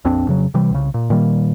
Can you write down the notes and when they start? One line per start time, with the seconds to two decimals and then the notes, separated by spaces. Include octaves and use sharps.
0.05 A#1 F2 C4 D4
0.27 F2 C#3 F#3
0.54 C3 E3 G3
0.71 C2 C#3
0.94 A#2
1.10 A#2 D#3 G3 A#3